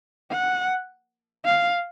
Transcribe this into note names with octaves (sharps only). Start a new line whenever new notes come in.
F#5
F5